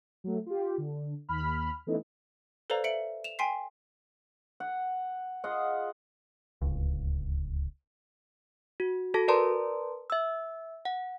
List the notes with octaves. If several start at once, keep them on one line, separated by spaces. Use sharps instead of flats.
F#3 A3
F4 G4
D3
D#2 B5 F6
E3 A3 B3 C#4 D#4 E4
A4 B4 C5 D5 F5 A#5
E5 C#7 D7 F#7
E7 F7
G5 G#5 C6 B6 C7
F#5
F4 G#4 D#5 F#5
D1 C#2
F#4
F#4 A4 A5
A#4 B4 D5 A5 A#5 C6
E5 E6
F#5